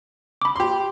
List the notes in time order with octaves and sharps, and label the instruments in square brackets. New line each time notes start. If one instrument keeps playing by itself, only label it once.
[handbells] B5 D6
[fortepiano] G4 C6